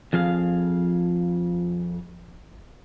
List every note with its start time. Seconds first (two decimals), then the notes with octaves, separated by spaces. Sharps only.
0.13 F2 F3 G#4 F5